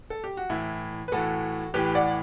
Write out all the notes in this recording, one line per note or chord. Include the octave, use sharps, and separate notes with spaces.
A4
G4
F#4
A2 E3 E4
B4
A2 E3 F#4 A4
A2 E3 G4 B4
D5 F#5